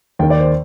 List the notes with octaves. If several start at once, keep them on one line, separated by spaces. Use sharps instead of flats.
D#2 D#3 G5
D5
C5